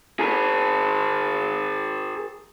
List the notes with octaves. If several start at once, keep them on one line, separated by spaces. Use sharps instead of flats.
G#4 A#4